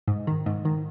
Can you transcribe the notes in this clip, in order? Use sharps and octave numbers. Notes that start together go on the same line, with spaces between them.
G#2
D#3
G#2
D#3